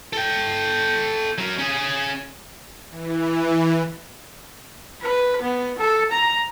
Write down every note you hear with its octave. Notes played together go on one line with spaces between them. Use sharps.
A4 G5
F#3 A#4
C#4 G#4
E3
B4
B3
A4
A#5